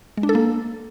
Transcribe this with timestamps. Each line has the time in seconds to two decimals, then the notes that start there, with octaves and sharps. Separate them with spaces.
0.17 G#3
0.23 D4
0.29 A4
0.35 A#3